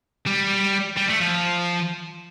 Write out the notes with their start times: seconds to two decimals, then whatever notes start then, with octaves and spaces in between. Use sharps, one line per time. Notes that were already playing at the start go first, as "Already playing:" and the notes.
0.26 G3
0.97 G3
1.09 A3
1.21 F3